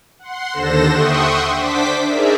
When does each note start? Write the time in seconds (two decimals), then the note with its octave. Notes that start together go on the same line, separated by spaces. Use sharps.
0.19 F#5 C6
0.52 D#2 D3 A4 C5 A#6 E7
0.91 E5 F#5 G5 C6 C#6 D#6
1.55 D4 C5 D6 B6
2.06 D#4 G#4 A#4 D5 E5